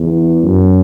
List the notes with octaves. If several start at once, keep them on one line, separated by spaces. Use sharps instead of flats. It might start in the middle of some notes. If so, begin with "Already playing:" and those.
Already playing: E2
F#2